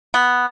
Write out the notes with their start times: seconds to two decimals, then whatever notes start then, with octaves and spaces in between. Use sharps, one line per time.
0.14 B3